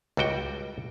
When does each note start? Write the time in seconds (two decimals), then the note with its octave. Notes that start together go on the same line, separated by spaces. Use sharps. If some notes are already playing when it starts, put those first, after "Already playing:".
0.17 C#2 G3 F#4 G5